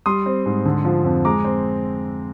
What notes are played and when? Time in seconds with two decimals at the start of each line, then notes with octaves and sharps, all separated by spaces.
0.06 G3 C6 D#6
0.26 C4
0.46 G#2
0.65 D3
0.85 F3
1.05 F2
1.25 G#3 A#5 D6
1.44 C4